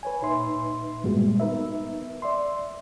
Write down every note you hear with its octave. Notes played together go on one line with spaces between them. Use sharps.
B4 C#5 G#5
A#2 D#4 B4 E5 C6
G2 A#2 G3 G#3 B3 F#4
B3 D#4 A#4 B4 E5
D5 E5 C6